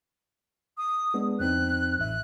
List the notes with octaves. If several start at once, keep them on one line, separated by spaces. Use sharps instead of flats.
D#6
G#3 B3 D4
F2 C4 D#4 F#6
A1 E5 F#6